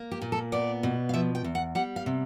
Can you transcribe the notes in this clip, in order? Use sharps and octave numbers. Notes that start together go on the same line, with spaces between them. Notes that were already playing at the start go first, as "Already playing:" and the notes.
Already playing: A#3
G4
A#2
A4
B3 D5
B2
F5
F3 E5
G5
E2
F#5
G3 F#5
F5
C3